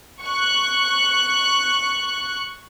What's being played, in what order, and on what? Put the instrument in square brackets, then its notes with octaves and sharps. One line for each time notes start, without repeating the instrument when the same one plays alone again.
[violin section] C#6 F#6